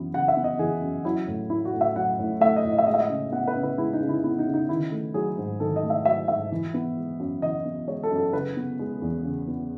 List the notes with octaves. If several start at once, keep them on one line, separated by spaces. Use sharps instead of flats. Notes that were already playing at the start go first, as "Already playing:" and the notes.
Already playing: F#2 E3 B3
C#3 F#5
E5
B3
D#5
E3 G#4
F#2
F#3 E4
A2
A3 E4
F#4
A2
E5
F#3 F#5
A2
A3 E5
D#5
A2
D#5
E5
G#3 D#5
E5
D#5
C#3
B3 F#5
B4
C#3
B4
G#3 E4
D#4
C#3
E4
B3 E4
D#4
C#3
D#4
D#3 E4
A3
F#3 G#4
G#2
D#3 A4
D#5
A3
E5
F#3 E5
G#2 E5
E3
B3
G#3
F#2
E3 D#5
B3
G#3 C#5
A4
F#2
A4
C#3 B4
B3
G#3
E2
C#3
B3